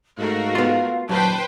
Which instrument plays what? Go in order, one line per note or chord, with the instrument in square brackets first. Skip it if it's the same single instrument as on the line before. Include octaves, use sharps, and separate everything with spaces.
[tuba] G#2 [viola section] A3 F#4 A#4 [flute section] F5
[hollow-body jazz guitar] B3 F4
[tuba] D#1 [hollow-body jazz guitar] F#2 [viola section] B4 C5 G5 [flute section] A5